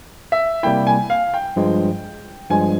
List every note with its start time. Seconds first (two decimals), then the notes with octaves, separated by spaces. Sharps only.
0.32 E5
0.63 C3 G3 A#3 E4 G5
0.87 G#5
1.10 F5
1.34 G5
1.56 G2 F3 G#3
2.50 G2 F3 G#3 G#5